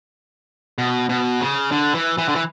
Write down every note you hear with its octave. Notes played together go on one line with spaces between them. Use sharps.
B2
B2
C#3
D3
E3
E3
D3
E3